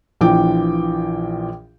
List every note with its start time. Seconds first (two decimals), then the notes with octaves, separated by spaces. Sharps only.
0.21 A#1 A#2 E3 G5 D6